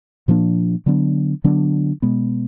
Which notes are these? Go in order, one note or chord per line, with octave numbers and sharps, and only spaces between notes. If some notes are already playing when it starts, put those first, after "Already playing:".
A#2 F3 A#3 D4
D3 F#3 B3 D4
D3 F#3 B3 D4
B2 G#3 B3